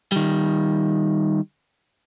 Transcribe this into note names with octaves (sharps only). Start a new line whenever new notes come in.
D#3 G3